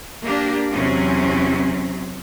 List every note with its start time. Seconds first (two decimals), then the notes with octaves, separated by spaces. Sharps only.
0.24 A#3 D4 G4
0.74 E2 C3 F#3 C4 C#4